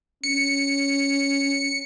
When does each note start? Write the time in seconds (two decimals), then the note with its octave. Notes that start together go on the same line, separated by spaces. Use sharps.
0.24 C#4 C#7